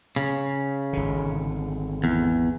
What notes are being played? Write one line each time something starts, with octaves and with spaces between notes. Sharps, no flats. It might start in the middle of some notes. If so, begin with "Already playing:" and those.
C#3
G#1 D3
E2